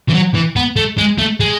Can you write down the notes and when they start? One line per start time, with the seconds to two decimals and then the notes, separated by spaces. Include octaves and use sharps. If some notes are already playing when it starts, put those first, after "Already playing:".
0.09 E3
0.14 F#3
0.34 E3
0.56 B3
0.76 A3
0.98 G#3
1.19 A3
1.40 G#3